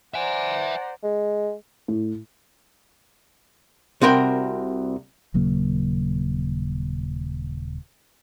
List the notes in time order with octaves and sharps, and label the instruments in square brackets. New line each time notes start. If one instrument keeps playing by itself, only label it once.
[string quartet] C5 D5 A#5 [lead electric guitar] E5 G#5 [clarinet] F#5
[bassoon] G#3
[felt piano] A2
[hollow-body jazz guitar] C2 C4 F#4 A#4 G5
[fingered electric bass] D#1 C#3 F#3 A#3